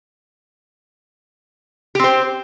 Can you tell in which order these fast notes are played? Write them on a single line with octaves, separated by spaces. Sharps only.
G4 C4 C5